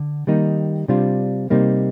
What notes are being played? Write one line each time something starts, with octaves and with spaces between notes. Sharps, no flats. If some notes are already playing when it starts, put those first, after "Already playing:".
Already playing: D3
D#3 G3 A#3 D#4
C3 G3 D4 F4
C3 G3 A#3 D#4